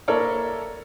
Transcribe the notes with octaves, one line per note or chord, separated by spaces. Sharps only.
A#3 E4 A4 A#4 C#5 D5